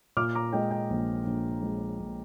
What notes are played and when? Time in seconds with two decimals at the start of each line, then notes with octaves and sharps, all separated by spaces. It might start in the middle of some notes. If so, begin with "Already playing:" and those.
0.17 A#2 D6 F6
0.35 A#5 D6
0.53 G#3 D#5 G5
0.71 D#5 G5
0.90 A#1
1.26 A#1
1.63 G#3
1.99 A#1